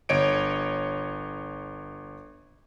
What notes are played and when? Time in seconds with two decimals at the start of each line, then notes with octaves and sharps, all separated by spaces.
0.09 G1 C#5 D#5 D7